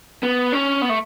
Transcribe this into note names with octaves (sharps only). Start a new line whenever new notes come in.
B3
C#4
B3
A3